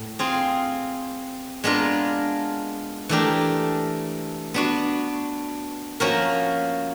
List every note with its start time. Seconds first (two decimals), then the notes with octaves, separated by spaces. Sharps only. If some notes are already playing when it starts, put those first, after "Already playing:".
Already playing: A2
0.19 C4 F4 G#4
1.64 G#3 B3 D4 F4 A#4
3.09 E3 A3 D4 G4 A#4
4.54 B3 D4 F#4
6.00 F3 A#3 C#4 F#4 A#4